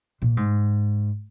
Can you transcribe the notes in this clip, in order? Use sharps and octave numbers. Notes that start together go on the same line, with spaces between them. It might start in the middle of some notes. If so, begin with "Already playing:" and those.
A#2
G#2